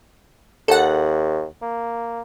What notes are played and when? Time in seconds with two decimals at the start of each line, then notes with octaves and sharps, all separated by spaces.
0.68 D#2 A4 F#5
1.62 A#3